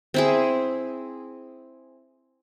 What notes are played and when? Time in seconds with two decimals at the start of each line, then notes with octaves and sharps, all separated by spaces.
0.14 C4 E4 G#4